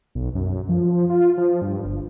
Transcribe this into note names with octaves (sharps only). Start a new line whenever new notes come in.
B1
F#2
F3
F4
F3
G2
G1